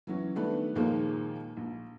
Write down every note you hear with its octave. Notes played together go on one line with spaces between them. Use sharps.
E3 F#3 C#4
D#3 G3 A3 B3 D4 B4
D#2 A#2 D#3 F3 G#3 A#3
A#1